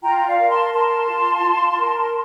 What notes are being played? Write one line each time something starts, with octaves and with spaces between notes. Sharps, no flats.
F4 G5 A#5
D5 F5
A#4
A5 C6
A#4 A5 C6
F4
F4
A#4